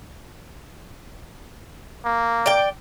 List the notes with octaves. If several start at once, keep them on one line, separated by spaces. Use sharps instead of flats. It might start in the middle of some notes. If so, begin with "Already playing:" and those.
A#3
D5 G5